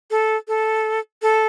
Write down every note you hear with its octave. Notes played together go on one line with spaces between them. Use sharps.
A4
A4
A4